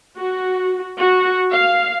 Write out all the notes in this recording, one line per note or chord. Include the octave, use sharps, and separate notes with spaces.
F#4
F#4
F5